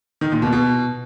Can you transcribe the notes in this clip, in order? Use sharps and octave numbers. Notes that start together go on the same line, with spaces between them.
D#3
A#2
B2
B2